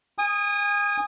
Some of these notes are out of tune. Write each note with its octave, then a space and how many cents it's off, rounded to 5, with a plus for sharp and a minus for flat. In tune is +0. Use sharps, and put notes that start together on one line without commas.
G#5 -30 D#6 -5